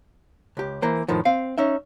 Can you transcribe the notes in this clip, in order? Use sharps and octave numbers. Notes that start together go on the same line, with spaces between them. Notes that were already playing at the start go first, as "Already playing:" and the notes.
C#2 G4
E3 A#3 C5
F2 A2 D#3 F3
C4 F5
C#4 D#4 E5